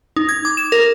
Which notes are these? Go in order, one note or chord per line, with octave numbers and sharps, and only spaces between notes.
D#4
G#6
D6
E7
A#4